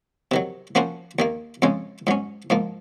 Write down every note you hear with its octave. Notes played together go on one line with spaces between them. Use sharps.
C3 D#3 F#3
F3 A#3 C#4 F#4 C5
D#2 D#3 A#3
F2 C#3 G#3 C#4
G#2 F#3 C#4
G#2 F3 A#3